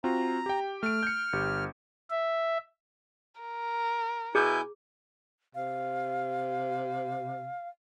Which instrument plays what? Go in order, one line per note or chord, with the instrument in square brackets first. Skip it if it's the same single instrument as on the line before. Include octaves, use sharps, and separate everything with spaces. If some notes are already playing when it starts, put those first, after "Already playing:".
[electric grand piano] C4 F4 F#4 [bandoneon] A#5
[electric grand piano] G4 G5
[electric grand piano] A3 D7 [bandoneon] F6
[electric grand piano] G6 C#7
G1 G4
[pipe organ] E5
[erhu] A#4
[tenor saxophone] B2 [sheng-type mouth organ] E4 G#5 G6 [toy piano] G#4
[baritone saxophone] C3 [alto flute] F5